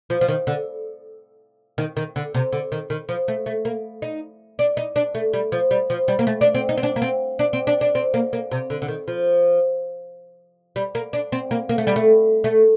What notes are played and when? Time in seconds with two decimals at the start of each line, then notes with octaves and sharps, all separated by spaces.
0.10 F3
0.21 F3
0.28 D#3
0.47 D3
1.78 D#3
1.97 D#3
2.16 D3
2.34 C3
2.53 D3
2.72 D#3
2.90 D#3
3.09 F3
3.28 A3
3.46 A3
3.65 A#3
4.02 D#4
4.59 D4
4.77 D#4
4.96 D4
5.15 A3
5.33 G3
5.52 F3
5.71 G3
5.90 F3
6.08 G3
6.19 A#3
6.27 A3
6.41 D4
6.55 C4
6.69 D#4
6.77 C4
6.83 D4
6.96 A#3
7.02 C4
7.39 D4
7.53 C4
7.67 D4
7.81 D4
7.95 C4
8.14 A#3
8.33 A#3
8.51 C3
8.70 D3
8.82 D3
8.88 D#3
9.08 F3
10.76 G3
10.95 A#3
11.13 D4
11.32 C4
11.51 A#3
11.69 A#3
11.78 A3
11.87 G3
11.96 A3
12.44 A3